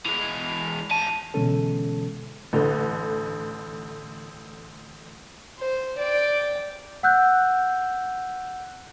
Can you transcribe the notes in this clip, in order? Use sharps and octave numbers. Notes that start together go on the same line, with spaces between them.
E3 G#3 F7
E3 A5 D#7
B2 D3 E3 G#3 C#4 A4
A1 D3
C5
D5 G5
F#5 E6 F#6 G6